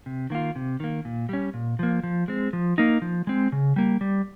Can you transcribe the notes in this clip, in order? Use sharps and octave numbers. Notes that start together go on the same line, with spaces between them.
C3
D#3 A#3 F4
C3
D#3 A#3
A#2
G3 C#4
A#2
F3 A#3
F3
G#3 C4
F3
A#3 D#4
F3
G#3 C4
C#3
G3 A#3
G3